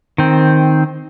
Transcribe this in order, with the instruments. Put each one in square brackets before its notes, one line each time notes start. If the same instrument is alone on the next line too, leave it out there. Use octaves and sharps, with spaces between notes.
[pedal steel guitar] D#3 C4